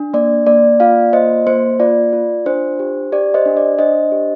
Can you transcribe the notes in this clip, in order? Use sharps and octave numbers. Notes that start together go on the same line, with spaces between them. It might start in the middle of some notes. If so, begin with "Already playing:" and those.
Already playing: D4
A#3 D5
A#3 D5
F4 D5 F5
A#3 C5 D#5
A#3 C5
F4 D5
F4
D4 C5
G4
G4 D5
C5 D#5
D4
D5
D4 C5 D#5
G4